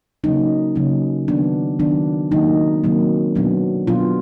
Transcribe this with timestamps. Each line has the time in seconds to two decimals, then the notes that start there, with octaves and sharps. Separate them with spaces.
0.24 C#3 F#3 A#3 C#4 D#4
0.76 C#3 F#3 A#3 C#4
1.28 D#3 F#3 B3 D4
1.79 D#3 F#3 B3 D4
2.31 C3 D#3 F#3 A#3 D#4
2.84 C3 D#3 F#3 A#3
3.35 B2 F#3 B3 D4
3.87 B2 F#3 B3 D4 F4